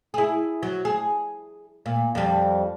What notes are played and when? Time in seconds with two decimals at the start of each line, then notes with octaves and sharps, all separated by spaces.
0.14 E4 G#4
0.63 F#3
0.85 G#4
1.86 A#2
2.15 F2 G3